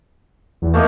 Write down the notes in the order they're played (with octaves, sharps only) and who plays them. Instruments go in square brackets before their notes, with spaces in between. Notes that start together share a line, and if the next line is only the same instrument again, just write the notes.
[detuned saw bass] E2
[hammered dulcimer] A3 A#3 D#4